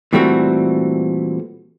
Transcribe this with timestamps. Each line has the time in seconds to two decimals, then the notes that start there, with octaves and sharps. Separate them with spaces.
0.13 A#2 E3 G3 A3 C4 F#4